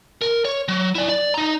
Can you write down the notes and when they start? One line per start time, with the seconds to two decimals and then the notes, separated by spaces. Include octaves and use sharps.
0.22 A#4
0.45 C#5
0.68 F#3
0.95 E4 D5
1.09 D5
1.34 D#4 A#5